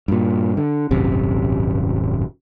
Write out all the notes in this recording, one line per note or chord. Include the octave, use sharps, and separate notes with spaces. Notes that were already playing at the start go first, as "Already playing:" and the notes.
G2 A#2
D3
D#1 G#1 F#2 C3